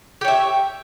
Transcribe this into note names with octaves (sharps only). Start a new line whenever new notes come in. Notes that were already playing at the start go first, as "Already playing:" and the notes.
G4 C#5 E5